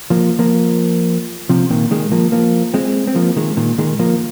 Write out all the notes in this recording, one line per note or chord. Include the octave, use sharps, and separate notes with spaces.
F3 A#3
F3 A#3
C3 F3
A#2 D#3
D#3 G#3
F3 A#3
F3 A#3
G#3 C4
C4
F3 A#3
D#3 G#3
A#2 D#3
D#3 G#3
F3 A#3